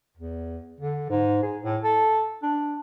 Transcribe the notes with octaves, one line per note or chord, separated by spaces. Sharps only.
E2
D3
G#2
G#4
A2
A4
D4